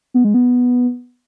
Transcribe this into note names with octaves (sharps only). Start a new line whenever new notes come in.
B3
G#3
B3